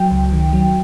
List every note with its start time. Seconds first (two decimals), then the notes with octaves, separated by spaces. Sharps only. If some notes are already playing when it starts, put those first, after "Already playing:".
Already playing: F#3 G5
0.11 C#2
0.32 D#3
0.53 F#3